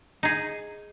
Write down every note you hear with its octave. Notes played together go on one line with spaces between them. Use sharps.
D#4 G#4